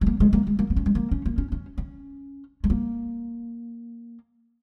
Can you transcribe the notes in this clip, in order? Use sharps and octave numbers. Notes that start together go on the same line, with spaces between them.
G#3
A#3
G#3
A#3
G#3
A#3
A#3
C#4
G#3
A#3
C#4
A#3
C#4
C#4
C#4
G#3
A#3